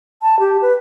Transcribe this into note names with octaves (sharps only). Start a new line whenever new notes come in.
A5
G4
B4